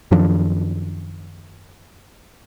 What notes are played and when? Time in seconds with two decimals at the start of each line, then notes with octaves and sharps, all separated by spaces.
0.11 F#2 D#3 F3 D4